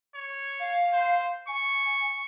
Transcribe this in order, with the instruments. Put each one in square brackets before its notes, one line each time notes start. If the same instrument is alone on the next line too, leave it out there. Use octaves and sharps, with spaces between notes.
[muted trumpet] C#5
[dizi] F5
[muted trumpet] C5
[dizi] G#5 [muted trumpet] C#6